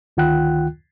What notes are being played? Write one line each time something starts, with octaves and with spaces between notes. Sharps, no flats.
D2 D#3 F4 F#5 G5 F#6